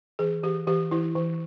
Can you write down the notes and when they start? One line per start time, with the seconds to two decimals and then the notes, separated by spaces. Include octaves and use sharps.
0.19 E3 G#4
0.43 E3 G4
0.67 E3 G4
0.91 E3 E4
1.15 E3